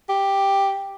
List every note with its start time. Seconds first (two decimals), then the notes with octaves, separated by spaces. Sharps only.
0.09 G4